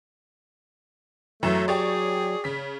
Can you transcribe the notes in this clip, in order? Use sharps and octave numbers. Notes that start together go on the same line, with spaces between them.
F#2 E3 F#3 A3 E7
G4 G#4 C#5 D5
C#3 B6